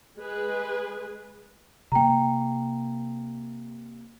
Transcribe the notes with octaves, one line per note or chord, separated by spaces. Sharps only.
G#3 G#4 B4
C3 A#3 G5 A#5